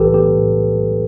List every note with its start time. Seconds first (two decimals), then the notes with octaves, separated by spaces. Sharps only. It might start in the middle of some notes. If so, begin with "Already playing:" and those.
Already playing: B1 A2 E3 G4 A4 B4
0.14 B3 G4
0.35 A2